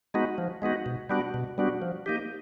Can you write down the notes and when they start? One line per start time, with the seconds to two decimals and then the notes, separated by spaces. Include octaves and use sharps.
0.14 G#3 B3 D#4 F#4
0.38 F3
0.62 G#3 B3 D#4 F#4
0.86 B2
1.10 G3 B3 D4 F#4
1.34 B2
1.58 G3 B3 D4 F#4
1.82 F3
2.06 A#3 D#4 G4